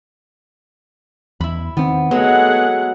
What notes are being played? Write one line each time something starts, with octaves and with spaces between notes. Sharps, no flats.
E2 E4 B5
D#3 B3 C4
F#3 G#3 A3 B3 G#4 F#5